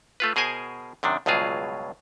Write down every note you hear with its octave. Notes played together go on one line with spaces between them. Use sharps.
A3 F4 B4
B2 G#4 A#4 C5 G#5
F#2 C3 D#3 D4
C#2 G2 B2 F#3 F4 G#4